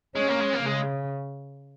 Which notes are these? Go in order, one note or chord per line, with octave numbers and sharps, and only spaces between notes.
G#3 C#4
A#3
G#3
A#3
C#3 G#3